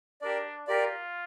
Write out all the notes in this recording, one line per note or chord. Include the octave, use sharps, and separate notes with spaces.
D4 G4 A#4 D5
F4 G4 A#4 D5